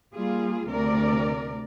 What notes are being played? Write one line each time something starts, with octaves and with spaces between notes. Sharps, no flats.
G3 A#3 F4 G#4
D2 C3 A#4 D5